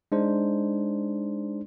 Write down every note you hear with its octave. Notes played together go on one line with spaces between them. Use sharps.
G#3 D4 D#4 C5